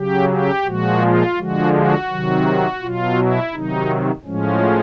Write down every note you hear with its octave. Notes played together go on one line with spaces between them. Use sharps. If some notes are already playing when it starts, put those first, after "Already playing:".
Already playing: C#3 F#3 G4
G4
A#2 F3 G#3 F#4
F4
D3 F3 G#3 F#4
F#4
C3 D#3 F#3
B2 F#3 F4
E4
C3 D#3 F#3 D#4
A2 F3 G#3 C#4